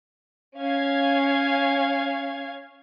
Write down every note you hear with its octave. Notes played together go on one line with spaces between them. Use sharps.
C#4 F5 G#6